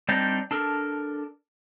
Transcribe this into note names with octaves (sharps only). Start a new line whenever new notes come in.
G3 C4 D4 D#4 C5 D5
D4 A4 A#4